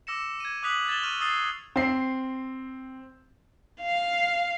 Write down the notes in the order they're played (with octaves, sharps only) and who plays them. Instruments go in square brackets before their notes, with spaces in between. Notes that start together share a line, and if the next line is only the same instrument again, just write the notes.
[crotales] D6 E6 A#6 C#7 E7
G#6 D#7
D6 D#6 F#6 B6 F7 F#7
G#6 A6 E7 F7 G7
C#6 E6 F6 D#7 F7
D#6 E6 A6 C7 G7
[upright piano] C4 C7
[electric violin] F5